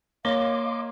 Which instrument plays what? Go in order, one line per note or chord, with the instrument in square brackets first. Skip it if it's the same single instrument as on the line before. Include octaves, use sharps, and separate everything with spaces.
[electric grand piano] A#3 [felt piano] C#5 [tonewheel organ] D#5 C6 D6 [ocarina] F5